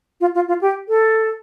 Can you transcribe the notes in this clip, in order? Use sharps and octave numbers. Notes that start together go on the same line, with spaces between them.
F4
F4
F4
G4
A4